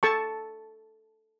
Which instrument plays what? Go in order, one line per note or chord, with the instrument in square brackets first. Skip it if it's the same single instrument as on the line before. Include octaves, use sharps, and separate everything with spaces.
[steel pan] A4 A5 C#6